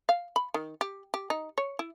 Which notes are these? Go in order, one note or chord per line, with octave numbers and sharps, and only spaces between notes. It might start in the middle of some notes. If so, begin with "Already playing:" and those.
F5
B5
D#3
G4
G4
D#4
C#5
E4